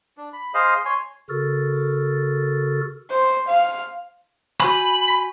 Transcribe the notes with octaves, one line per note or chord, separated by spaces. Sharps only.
D4
B5
G#4 C5 D#5 F5
C#5 G#5 C6
C#3 F#4 A4 A#4 A6
C5
F5
F#4 G#5 B5